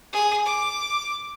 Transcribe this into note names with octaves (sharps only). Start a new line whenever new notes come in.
G#4
D6